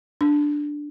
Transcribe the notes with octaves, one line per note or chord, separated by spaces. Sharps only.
D4